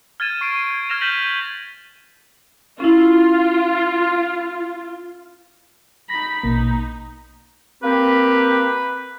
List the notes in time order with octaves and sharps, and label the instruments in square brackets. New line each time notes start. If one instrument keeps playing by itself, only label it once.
[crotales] F6 G#6 A6 D#7 E7
C#6 C7 D7
G#6
F6 G#6 A#6 E7 F7
G6 A#6 B6 D#7 F#7 G7
[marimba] C#4 E4 [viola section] F4
[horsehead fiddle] D#4 B5 [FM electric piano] A#6
[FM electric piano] A#1 B2 A#3 [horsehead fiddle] D#4
[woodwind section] A#3 C4 G4 [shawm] B4